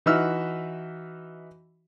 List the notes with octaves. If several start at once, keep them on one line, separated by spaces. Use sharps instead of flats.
E3 D#4 F#4 E5 E6 F6